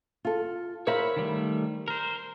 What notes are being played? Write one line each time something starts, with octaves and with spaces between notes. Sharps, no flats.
F4 A4
A#4 C5 C#5 E5 F5 B5
D#3 G3 A3
A#4 C5